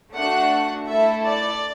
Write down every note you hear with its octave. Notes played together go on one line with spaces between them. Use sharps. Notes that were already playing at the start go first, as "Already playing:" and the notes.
A3 D4 F#4 F#5
A3 E4 A4 E5
D5